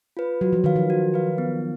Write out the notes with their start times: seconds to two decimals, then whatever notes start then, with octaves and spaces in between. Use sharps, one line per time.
0.17 F4 B4
0.41 F#3 F#4
0.53 F3
0.64 D#3 B4 F5
0.76 F3
0.90 F#4
1.14 B4 F5
1.38 B3